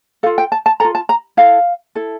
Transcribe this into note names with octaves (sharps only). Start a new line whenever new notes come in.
F4 A4 F5
G5
A5
A5
F4 A4 A#5
A5
A#5
E4 A4 F5
E4 A4